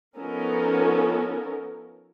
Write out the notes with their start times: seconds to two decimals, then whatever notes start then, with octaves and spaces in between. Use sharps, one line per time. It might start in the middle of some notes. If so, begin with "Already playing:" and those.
0.17 F3 B3 C#4 D#4 A4 A#4